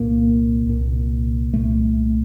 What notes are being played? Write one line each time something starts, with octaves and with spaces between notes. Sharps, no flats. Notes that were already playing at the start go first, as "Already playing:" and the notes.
Already playing: C2 A#2 A#3
C2 A#2
C2 A#2 A3